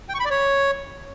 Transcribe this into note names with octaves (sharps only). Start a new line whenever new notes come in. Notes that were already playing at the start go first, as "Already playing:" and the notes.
G5
C#6
B5
D5
C#5